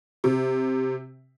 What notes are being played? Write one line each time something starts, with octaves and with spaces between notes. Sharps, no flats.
C3